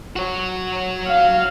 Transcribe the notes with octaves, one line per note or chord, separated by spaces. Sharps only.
F#4 C#5
F5